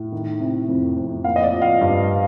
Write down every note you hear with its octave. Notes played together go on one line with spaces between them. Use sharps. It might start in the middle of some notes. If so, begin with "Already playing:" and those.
Already playing: A2
D#3
C3
F2
F2
A#3 F5
D#5
D5
F3
F5
G2